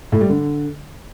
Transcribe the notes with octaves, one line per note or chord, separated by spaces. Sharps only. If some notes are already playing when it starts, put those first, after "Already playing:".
A2
G3
D3